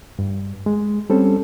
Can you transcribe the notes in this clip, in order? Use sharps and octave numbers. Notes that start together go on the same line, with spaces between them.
G2
G#3
G3 C4 C#4 A4